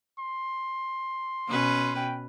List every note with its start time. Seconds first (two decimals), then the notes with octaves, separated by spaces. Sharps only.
0.19 C6
1.48 B2 C#4 B4
1.96 G5